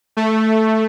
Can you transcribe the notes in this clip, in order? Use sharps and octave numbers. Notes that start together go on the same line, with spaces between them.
A3